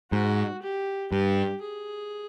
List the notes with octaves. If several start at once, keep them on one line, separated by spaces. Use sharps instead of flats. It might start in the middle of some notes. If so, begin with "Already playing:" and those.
G#2 F#4
G4
G2 G4
G#4